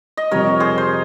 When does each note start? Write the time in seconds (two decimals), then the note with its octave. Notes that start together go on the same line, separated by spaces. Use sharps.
0.17 D#5
0.31 F2 C3 G3 A#4 C#5
0.60 G#4 C5
0.78 C5